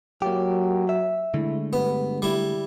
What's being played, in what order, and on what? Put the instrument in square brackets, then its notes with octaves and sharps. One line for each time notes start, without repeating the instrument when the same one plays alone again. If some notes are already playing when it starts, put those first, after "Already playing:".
[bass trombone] F#3 [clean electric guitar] A#3 F4 G4
[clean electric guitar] E5
[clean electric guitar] D3 G#3 A3 [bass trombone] E4
[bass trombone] G2 [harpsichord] B3
[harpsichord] G3 E4